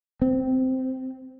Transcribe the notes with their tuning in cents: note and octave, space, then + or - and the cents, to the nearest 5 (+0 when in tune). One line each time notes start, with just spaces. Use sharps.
C4 -10